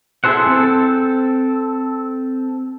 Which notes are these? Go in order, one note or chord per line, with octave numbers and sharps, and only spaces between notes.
E4 G#4 A4 C5 F#5
C4 A4